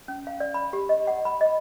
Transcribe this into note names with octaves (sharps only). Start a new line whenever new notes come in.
C#4
F5
D5
B5
G4
D#5
F#5
B5
D#5